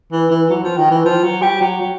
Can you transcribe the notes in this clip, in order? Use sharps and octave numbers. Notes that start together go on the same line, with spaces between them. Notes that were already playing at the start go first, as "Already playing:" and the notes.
E3
E3
F#3
F3
D#3
E3
F3
F#3
G3
F#3
F#3